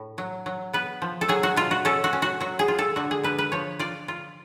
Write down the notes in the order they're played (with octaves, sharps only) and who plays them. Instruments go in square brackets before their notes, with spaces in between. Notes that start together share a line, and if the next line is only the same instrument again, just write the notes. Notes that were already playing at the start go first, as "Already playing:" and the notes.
Already playing: [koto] A2
F#3
F#3
B3 B4
F3
A4
F#3 G#4
F#4
B2 F4
F#4
C#4 A4
F#4
C#4
F#4
F#3 F#4
G#4
F4
A4
D3 F#4
G#4
D3 B4
B4
F3 C#5
F4 D5
F4